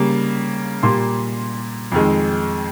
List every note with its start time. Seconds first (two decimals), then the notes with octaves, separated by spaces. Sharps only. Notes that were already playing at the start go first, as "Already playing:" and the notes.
Already playing: C#3 G3 A#3
0.83 A#2 G3 A#3 C6
1.92 F2 D#3 G#3